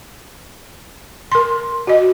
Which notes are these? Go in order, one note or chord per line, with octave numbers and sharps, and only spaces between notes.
A#4 C6
F#4 D#5